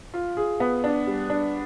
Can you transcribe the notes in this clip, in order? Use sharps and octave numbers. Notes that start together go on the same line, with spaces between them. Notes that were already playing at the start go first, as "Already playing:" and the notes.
F4
G#4
B3
D4
G3
D4